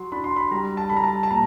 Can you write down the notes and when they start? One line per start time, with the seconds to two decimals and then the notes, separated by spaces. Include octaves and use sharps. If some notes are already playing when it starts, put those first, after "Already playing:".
Already playing: F#3 C6
0.12 D4 B5
0.24 C6
0.36 B5
0.51 G3 A#5
0.77 A5
0.89 G3 B5
0.97 A#5
1.04 A5
1.23 A5
1.31 A#2 A#5